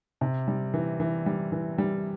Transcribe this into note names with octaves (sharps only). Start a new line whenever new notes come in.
C3
G3
E3
E3
G3
E3
G3